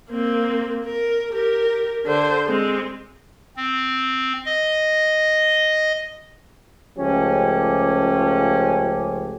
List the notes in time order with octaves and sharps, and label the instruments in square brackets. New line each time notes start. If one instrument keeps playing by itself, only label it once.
[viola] A#3 C4
A#4
G4 A#4
D3 C5
G#3 C4
[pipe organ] C4
D#5
[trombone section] C#2 F3 A3 C#4 G4